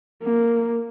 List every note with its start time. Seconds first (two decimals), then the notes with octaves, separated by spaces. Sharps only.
0.23 A#3